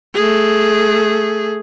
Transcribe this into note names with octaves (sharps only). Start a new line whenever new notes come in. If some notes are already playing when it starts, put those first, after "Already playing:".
A3 G#4